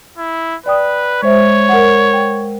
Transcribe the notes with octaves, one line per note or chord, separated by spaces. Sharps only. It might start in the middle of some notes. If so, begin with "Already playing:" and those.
E4
B4 D5 G5 D#6
G#3 C5 C#5 E5
A#4 F#5
G5